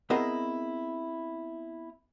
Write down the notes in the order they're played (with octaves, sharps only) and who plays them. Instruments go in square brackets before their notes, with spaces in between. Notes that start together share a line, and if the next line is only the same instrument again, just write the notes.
[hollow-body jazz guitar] B3 C4 E4 G#4 A#4 D#5